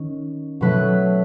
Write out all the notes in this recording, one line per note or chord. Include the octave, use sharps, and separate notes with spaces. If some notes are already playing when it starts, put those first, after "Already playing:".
Already playing: D#3 C#4
B2 F#3 A3 B4